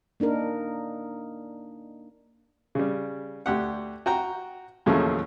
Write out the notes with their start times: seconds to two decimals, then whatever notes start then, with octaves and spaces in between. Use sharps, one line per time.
0.20 A#3 D4 D#4 A#4
2.75 C#3 G3
3.46 D2 G4 F#5
4.06 F#4 G5 A#5
4.86 D#2 A2 C#3 F3 F#3 A3